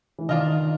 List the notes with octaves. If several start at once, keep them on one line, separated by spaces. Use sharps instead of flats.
E3
D#3 D4 F4 A#4 D#5